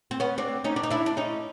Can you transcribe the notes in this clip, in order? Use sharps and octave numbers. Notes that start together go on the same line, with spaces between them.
C4
B3 C#4
C4 D4
C#4 D#4
D4
D#4
D4 E4
D4
C#4 D#4